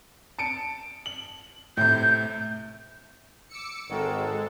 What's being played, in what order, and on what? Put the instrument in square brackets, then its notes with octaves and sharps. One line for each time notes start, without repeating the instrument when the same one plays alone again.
[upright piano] A5 C#7 D7
F#7
[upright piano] A2 C3 [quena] G6
[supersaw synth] D6 E6 C#7
[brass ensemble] G#1 [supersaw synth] G#3 A4 [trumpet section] F#4 A#4 G5